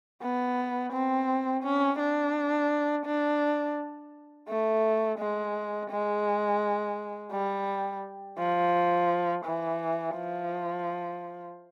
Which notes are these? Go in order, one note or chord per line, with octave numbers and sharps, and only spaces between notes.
B3
C4
C#4
D4
D4
A3
G#3
G#3
G3
F3
E3
F3